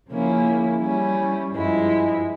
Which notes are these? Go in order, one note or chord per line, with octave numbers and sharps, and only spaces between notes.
C#3 F3 A#3 C#4 E4
G3 C#4 E4
G2 F3 G#3 E4